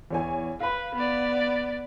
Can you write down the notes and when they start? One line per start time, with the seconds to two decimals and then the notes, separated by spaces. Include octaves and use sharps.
0.11 E2 C#5 G#5
0.60 B4 F5 B5
0.95 B3 D5